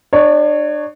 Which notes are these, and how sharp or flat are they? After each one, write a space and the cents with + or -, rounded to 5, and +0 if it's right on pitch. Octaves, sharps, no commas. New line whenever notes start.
D4 +30 C#5 +0